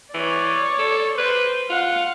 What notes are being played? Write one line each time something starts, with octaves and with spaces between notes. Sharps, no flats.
E3 C#5 D5
A4
B4 C5
F4 F5 F#5